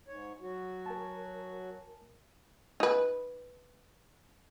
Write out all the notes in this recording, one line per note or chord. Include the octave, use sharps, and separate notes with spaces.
G#2 C#5
F#3 F#4
A#4 G#5 A5
D#4 B4